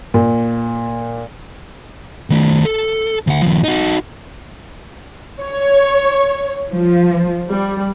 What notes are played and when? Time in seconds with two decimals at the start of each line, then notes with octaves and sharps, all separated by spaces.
0.14 A#2
2.30 D#3 A3
2.65 A4
3.27 D2 F#5
3.42 D#2 F3
3.64 D#4 F#4
5.42 C#5
6.72 F3
7.50 G3